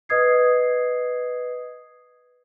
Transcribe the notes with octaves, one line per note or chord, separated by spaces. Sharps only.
B4 D#5 D#6 G#6 C7